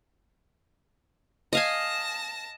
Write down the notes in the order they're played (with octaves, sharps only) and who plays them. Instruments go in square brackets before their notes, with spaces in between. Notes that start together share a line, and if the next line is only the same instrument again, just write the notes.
[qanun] D#5 F5 G#5 [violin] A5 A#6